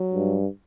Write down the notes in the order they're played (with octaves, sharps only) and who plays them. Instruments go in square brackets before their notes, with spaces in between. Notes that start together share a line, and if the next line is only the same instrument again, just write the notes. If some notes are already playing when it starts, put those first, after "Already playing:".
Already playing: [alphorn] F#3
[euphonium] G2